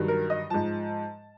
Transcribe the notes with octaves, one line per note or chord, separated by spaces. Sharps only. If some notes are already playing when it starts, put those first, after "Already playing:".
Already playing: G2 D#3 F#3
A#4
D#5
G#2 F3 A5